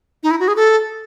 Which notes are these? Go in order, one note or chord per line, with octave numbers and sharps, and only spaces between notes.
D#4
E4
F#4
G#4
A4